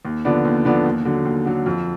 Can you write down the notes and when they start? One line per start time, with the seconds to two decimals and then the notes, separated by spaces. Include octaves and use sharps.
0.05 D#2
0.25 D3 F3 B3 D4
0.45 D#2
0.65 D3 F3 B3 D4
0.86 D#2
1.05 D3 F#3
1.25 D#2
1.46 D3 F#3
1.66 F2